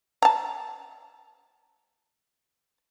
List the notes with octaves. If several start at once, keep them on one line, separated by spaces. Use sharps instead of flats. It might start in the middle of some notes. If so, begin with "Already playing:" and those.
A5 A#5